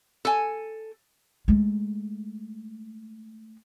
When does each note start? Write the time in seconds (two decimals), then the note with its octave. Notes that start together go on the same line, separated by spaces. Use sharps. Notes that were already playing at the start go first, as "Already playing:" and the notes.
0.25 A4 G#5
1.48 G#3 A3